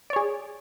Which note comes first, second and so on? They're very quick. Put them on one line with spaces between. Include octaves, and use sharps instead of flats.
D5 C#5 G#4